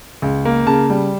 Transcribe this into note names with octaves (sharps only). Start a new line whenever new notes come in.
C#2
A#3
C#3 A5
G3